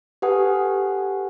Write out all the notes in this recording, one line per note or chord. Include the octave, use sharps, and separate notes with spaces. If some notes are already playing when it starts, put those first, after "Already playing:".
G4 A4 B4 F#5 G#5 D#6